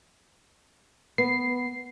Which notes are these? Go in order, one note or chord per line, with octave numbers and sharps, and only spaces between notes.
B3 C7